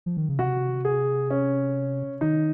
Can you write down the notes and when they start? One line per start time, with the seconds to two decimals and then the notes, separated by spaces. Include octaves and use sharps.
0.06 F3
0.17 D#3
0.29 C#3
0.39 C3 F#4
0.85 G#4
1.30 C#4
2.21 D#3 D#4